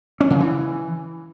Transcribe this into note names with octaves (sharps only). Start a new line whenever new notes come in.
C#4
C#3
E3